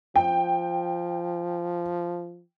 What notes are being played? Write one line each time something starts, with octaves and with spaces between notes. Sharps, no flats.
F3 G5